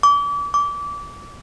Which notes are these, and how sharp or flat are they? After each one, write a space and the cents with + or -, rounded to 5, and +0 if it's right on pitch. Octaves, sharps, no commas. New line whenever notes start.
D6 -35
D6 -25